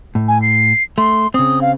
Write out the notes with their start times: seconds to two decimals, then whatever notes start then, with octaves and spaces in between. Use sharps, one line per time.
0.15 A2
0.28 G#5
0.42 C7
0.98 A3 C6
1.34 C#3 C4 D#6
1.61 F5